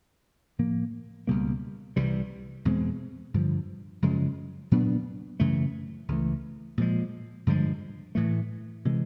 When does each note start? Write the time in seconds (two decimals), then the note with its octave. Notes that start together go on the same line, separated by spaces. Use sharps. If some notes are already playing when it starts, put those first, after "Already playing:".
0.59 A2 F3 A#3
1.27 C#2 B2 G3 A#3
1.96 C2 C3 E3 G3
2.65 E2 B2 G#3 C4
3.34 G2 D3 F3
4.02 F#2 C#3 F3 G#3
4.72 A#2 F#3 B3 D4
5.40 F#2 C#3 E3 A3
6.08 C#2 C#3 E3 A3
6.78 A#2 F3 G#3
7.47 G2 D3 F3 G#3
8.15 A2 E3 A3
8.85 C3 E3 G#3